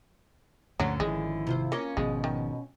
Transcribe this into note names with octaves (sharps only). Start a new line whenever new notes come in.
D2 G2 A#2 D3 F3 F#3 C#4
G#1 F3 G#3 E4
C3 F4 C5
A#3 C#4 F4 D#5
G#1 B2 F3 G#3 B3
D#3